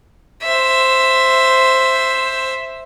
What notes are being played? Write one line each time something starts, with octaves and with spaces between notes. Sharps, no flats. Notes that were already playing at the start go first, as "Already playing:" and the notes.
C5 E5